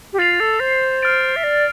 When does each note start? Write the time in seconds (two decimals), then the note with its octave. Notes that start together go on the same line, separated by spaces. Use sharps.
0.13 G4
0.19 F4 A6 C7 F7
0.40 A4
0.60 C5
1.02 F6 A6 D7
1.36 E5
1.44 D5